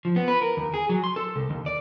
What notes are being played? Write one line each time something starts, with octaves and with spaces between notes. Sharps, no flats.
F3
B3
B4
A#4
D#2
G#4
F#3
C6
A4
C2
D#2
D5